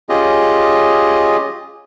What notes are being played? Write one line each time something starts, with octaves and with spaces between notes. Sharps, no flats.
C#4 F4 G4 G#4 D#5